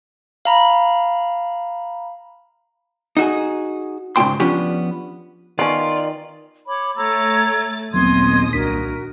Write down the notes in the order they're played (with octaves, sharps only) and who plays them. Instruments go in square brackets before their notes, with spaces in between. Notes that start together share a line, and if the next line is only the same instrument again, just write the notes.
[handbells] F5 A#5 B5
[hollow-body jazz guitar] D#4 F#4 G#4
G#2 C#3 D4 D#4 G5 C6
F3 B3 C#4 D4 G4
[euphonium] D#3 [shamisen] B3 C#4 [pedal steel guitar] F4 [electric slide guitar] D5
[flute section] C#5 B5 D6
[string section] A3 A6 [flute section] C#5 A#5 E6
[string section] A#1 D#2 D#6 [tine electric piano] F#3 B3 C4 [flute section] C6 G#6
[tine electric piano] C2 D4 B6 [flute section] F#4 A#4